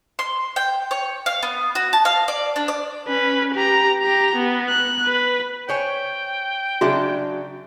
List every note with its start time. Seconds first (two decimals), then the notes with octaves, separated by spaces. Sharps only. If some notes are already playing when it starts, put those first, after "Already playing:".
0.19 C6
0.56 G5
0.91 C#5
1.26 F5
1.43 B3
1.75 F#4
1.93 A5
2.05 F5
2.28 D5
2.56 D4
2.68 D5
3.08 C#4 B4
3.54 G4 A#5
4.02 G4 A#5
4.36 B3
4.69 F#6
5.06 B4
5.69 C5 C#5 G5 G#5
6.81 C#3 F#3 D4 F#4 G#4 E5